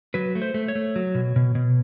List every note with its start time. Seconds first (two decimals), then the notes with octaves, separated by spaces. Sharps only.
0.14 F#3 B4
0.35 A3
0.42 C5
0.54 A3
0.68 C#5
0.75 A3
0.96 F#3
1.15 B2
1.36 B2
1.55 B2